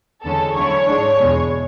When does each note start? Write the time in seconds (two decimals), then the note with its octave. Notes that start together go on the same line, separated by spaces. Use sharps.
0.24 E2 D3 G#3 C#4 A4
0.56 D2 D3 F#3 C#4 E4 C#5
0.88 G#2 G#3 D4
1.20 E2 B2 G#3